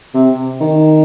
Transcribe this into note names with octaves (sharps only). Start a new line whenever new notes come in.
C3
D#3